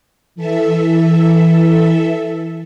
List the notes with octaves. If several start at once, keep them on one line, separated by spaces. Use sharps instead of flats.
E3 A4 E5